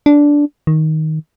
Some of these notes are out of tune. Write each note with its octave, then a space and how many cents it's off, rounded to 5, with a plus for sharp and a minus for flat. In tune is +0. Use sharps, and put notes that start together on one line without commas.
D4 -10
D#3 +10